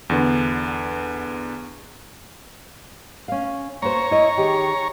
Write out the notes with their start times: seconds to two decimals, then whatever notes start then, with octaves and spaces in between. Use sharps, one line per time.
0.10 E2 D3 B3
3.28 C#4 F5
3.82 A#3 F#4 C5 C#5 A#5
4.11 E4 D#5
4.37 D#3 G4 G#4